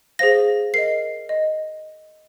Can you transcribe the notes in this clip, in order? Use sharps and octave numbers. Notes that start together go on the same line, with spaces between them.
G#4 C5 F5 A#6
A#4 D#5 C7
D#5